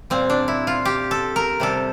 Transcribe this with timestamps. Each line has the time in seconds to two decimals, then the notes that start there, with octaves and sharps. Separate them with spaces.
0.10 A#2 G3 C4
0.30 D4
0.48 E4
0.67 F4
0.85 G4
1.11 A4
1.36 A#4
1.60 C3 G3 A4